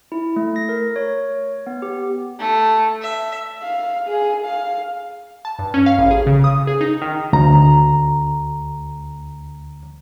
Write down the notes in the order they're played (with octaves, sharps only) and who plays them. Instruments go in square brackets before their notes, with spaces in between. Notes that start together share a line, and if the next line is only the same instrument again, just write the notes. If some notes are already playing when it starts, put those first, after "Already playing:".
[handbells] E4
A3
A#6
A#4
C#5
B3
G4
[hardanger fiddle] A3
E5
[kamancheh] F5
G#4
F5
[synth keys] A5
G2
C#4
F5
A1
G#4
C#3
D#6
G#4
D#4
D#3
[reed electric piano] D2 A#5